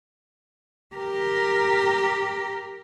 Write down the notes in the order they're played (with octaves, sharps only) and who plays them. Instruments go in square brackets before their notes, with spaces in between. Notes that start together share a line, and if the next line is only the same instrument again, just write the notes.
[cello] G4 A#4